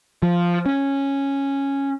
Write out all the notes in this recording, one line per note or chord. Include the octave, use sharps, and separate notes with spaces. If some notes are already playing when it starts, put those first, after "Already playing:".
F3
C#4